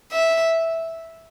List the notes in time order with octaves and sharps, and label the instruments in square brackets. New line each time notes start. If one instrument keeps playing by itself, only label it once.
[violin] E5